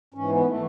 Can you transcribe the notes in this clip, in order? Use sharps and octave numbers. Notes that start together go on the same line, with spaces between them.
G#2 E3 C#4
B3
E3 A3